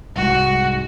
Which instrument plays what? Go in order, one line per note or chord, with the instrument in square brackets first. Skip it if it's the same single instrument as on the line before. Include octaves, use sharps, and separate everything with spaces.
[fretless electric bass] C2 G#2 [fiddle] F#4